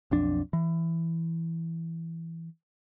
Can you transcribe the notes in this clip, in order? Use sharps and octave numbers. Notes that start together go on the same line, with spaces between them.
B1 F2 D4
E3